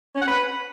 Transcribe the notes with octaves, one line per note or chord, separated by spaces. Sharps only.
C#4
F#5
B4